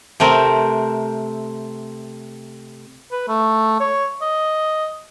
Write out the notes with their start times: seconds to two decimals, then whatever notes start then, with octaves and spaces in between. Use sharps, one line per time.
0.20 C3 A3 C4 A#4
3.12 B4
3.28 A3
3.80 C#5
4.21 D#5